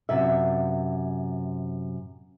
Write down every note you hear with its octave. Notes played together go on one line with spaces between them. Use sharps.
F#2 C3 E5